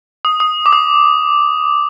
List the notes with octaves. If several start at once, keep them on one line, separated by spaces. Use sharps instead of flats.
D#6
D#6
D6
D#6